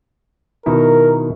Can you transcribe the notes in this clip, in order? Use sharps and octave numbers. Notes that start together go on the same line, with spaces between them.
B2 D#3 E4 A#4